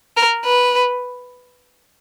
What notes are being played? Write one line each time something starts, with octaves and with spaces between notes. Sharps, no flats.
A#4
B4